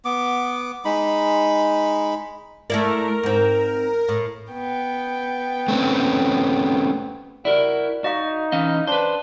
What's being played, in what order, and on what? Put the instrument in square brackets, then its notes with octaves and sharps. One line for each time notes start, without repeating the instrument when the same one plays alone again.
[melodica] B3 D6
G#3 D#4 B5
[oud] A3 E4 D5 [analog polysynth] A#4
[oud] G#2 C4
A2
[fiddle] B3 G5
[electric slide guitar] A3 C4 C#4
[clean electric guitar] E4 A#4 [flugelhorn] F#4 [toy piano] G4 D5
[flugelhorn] D#4 [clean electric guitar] F#4 [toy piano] D#5 F5 C#6
[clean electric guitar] E3 C#4 D#5 [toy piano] F5
[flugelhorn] D4 [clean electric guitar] B4 C5